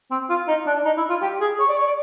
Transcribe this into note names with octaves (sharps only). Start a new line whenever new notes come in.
C4
F4
D#4
D4
D#4
E4
F4
G4
G#4
C#5
D5
C#5
D5